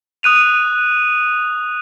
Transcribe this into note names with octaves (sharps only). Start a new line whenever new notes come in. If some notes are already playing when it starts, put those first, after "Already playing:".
D#6 F#6 D#7 F7